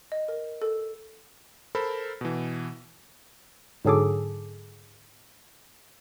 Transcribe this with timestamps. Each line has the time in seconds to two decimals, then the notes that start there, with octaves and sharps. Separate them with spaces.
0.12 D#5
0.28 A#4
0.62 A4
1.75 A4 A#4 C5 B5
2.21 B2 E3
3.85 G#2 D3 F#3 G#4 A4 D6